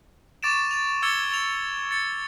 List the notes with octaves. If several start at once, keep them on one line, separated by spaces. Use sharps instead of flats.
C#6 D6 A6 D7 E7
A6 F7
D6 E6 G#6 A6 C#7 G7
A6 F7
A6 C#7